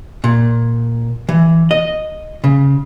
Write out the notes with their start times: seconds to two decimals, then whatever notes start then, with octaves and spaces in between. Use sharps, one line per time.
0.24 A#2
1.29 E3
1.71 D#5
2.44 C#3